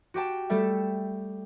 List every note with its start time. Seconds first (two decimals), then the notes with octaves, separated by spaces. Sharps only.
0.14 F#4 G4 G5 A5
0.50 G3 A3 A4 E5